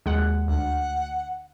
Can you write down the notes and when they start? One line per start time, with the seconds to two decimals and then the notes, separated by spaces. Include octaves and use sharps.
0.06 D#2 G#3 F#5
0.48 D2 F#5